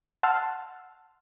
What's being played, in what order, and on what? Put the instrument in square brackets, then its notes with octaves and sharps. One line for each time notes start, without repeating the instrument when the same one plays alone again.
[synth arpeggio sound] F#5 A5 C6 E6 F6